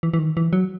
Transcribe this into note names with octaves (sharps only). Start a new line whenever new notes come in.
E3
E3
D#3
E3
F#3